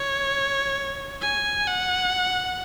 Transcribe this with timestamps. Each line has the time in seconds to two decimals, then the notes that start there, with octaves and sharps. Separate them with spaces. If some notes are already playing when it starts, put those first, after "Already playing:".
Already playing: C#5
1.21 G#5
1.67 F#5